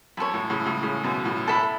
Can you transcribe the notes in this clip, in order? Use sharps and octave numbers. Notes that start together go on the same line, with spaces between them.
F#2 E4 A4 C#5
A2
A2 C#3
A2 C#3
A2 C#3
F#2 B2
A2
A2 A4 E5 B5